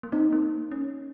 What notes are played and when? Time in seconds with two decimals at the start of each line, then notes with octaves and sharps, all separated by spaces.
0.03 A#3
0.12 C4 D#4
0.33 A#3
0.71 C#4